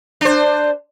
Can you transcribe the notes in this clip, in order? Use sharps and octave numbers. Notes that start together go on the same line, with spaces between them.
D4 C5